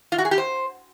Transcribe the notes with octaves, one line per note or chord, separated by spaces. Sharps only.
F4
F#4
G#4
G4
C5